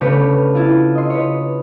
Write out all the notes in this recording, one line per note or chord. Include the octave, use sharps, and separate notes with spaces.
C#3 A3 D4 G4 B4 C#5
E4 F4
D#5 C6
B4 C#5